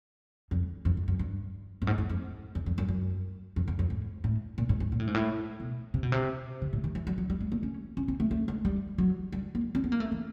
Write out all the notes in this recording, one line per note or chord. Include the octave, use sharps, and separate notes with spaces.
F2
F2
F#2
F#2
G2
G2
G#2
G2
F2
E2
F2
F#2
F#2
F2
E2
F2
G#2
A2
A#2
G#2
G2
A#2
A2
G#2
A2
B2
C3
B2
C3
C#3
A2
D#3
E3
F#3
F#3
G3
G#3
A#3
C#4
C#4
C4
A3
A3
G#3
G3
F#3
G3
A#3
C4
B3
A#3
A3
E3